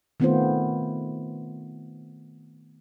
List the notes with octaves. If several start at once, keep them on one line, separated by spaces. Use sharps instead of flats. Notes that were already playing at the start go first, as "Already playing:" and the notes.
D#3 A3 B3 C4 F4 C5